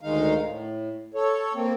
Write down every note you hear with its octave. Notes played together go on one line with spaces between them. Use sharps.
D2 D#3 G#3 D#4 F5
A2
A4 C#5
A#3 C4